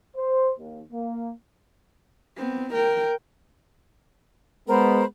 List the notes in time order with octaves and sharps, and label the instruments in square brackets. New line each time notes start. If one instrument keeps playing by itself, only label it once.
[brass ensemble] C5
D#2
A#3
[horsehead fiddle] B3 C4
A#4 G5
[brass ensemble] G#3 B3 [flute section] A#4 C5 B5